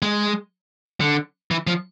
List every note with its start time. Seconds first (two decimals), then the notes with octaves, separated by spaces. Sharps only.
0.02 G#3
1.01 D3
1.51 E3
1.67 F3